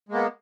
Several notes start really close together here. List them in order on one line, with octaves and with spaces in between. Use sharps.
G#3 A#3 B3